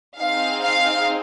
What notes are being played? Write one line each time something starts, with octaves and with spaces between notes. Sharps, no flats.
C4 D#4 G#4 F5
F5